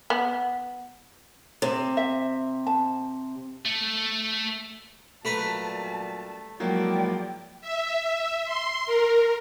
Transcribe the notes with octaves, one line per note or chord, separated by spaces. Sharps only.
B3
C3
E5
A5
A3
F#2 A#2 G3 A3 B4 A5 A#5
F3 F#3 G#3 A#3 E4 D5 G5
E5
E5
C6
A#4